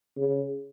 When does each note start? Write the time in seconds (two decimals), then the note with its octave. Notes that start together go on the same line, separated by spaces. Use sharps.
0.17 C#3